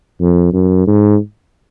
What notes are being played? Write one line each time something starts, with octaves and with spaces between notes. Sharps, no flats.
F2
F#2
G#2